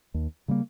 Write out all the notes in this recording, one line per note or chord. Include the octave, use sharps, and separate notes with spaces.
D#2
C#3 G3 A#3